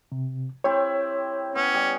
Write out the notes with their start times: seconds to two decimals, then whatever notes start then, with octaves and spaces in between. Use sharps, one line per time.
0.12 C3
0.64 C4 E4 G4 C#5
1.55 B3 C#4
1.74 G3 G#5